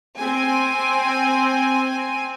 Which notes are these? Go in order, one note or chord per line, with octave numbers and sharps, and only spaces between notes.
C4 G#5